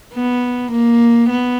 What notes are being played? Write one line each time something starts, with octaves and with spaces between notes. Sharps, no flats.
B3
A#3
B3